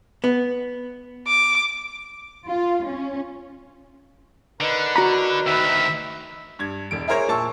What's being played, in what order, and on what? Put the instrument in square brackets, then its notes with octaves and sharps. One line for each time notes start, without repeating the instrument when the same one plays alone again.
[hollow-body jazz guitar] B3
[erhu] D6
[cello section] F4
C#4
[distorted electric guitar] D3 [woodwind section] D#4 A#4 B4
[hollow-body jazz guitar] F#4 A#5 B5
[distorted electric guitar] D2 D#3 [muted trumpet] E5
[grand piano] G2 G#6
E1 E2 D7
E4 G#4 A#4 C5 C#5
A#2 A5 C#6 E6